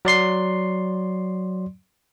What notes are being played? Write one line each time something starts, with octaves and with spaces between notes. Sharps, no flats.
F#3 D5 C6 C7